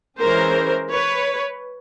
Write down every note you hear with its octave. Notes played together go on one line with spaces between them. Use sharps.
E3 G#3 C#4 A#4 C5
B4 C#5